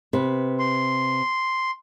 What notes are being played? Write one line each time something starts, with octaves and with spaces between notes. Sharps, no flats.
C3 B4
C6